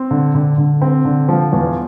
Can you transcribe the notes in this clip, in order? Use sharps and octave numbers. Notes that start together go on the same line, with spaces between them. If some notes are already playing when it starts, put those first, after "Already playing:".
Already playing: C4
D3
D3
D3
C4
D3
F3
E2